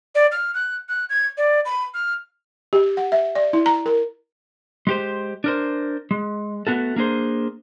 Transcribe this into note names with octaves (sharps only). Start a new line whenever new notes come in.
D5
F6
F#6
F#6
G#6
D5
B5
F6
G4
F#5
E5
D5
E4
A#5
A#4
G#3 G4 C5
D4 A#4 C5
G#3
A3 B3 F#4 A4
A#3 D4 G#4 C5